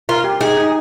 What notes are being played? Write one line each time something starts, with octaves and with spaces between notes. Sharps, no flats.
F4 A#4
G4
D#4 G#4
D#4